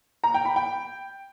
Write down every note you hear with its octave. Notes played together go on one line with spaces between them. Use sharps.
A#5
G5
B5
G5